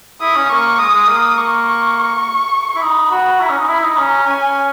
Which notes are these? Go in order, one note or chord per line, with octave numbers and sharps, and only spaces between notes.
E4 D#6
C#4
A#3 C#6
G#3 D#6
G#3
A#3
A#3 C#6
C#6
E4
D#4 B5
F#4
E4 A#5
C#4
D#4
E4 B5
D#4
C#4 A#5
C#4 G#5